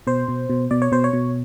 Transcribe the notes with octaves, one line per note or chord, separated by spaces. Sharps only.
B2 C5
B2
B2
B2 D5
C#5
B2 C5
C#5
B2